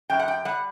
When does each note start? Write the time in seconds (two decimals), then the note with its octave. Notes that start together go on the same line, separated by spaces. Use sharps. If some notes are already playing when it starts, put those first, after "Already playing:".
0.10 F#2 G5
0.19 F#5
0.28 G5
0.45 G3 F#5